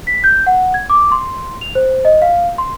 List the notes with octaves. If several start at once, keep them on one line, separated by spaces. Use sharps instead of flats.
B6
G6
F#5
G#6
D6
C6
F7
C5
D#5
F5
C6